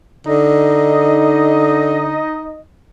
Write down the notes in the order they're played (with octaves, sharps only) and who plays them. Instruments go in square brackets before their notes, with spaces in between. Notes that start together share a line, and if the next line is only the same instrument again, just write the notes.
[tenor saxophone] D3 [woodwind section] D#4 D#5